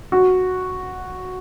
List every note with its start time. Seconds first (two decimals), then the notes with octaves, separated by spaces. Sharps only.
0.12 F#4